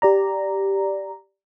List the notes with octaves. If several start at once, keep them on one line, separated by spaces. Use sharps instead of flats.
G4 D5 A#5